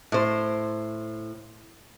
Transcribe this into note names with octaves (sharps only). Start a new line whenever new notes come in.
A2 C5